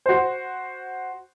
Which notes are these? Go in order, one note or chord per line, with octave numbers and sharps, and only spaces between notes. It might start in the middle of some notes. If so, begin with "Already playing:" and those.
F#4 C5